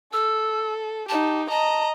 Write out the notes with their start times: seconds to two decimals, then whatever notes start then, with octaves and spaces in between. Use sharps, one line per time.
0.13 A4 E6
1.09 D#4 G4 A5
1.50 D#5 A5 A#5